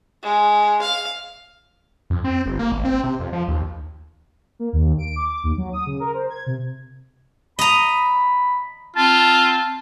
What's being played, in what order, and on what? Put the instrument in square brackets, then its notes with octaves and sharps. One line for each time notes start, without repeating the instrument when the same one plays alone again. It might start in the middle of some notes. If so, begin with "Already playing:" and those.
[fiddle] G#3
F5
[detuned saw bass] F2
C4
G1
A#3
G#1
C4
C3
F2
F3
D#2
[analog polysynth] A#3
D#2
D7
D6
D#2
F#3
D#6
C#3
A#4
C5
G#6
C3
[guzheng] D#5 A#5 [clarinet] B5
[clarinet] C4 [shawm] F4 [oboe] A5